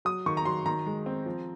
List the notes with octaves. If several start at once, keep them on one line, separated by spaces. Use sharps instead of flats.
F#3 D#6
D#3 C#6
A#5
F#3 C6
D#3 A#5
G#3
C4
F3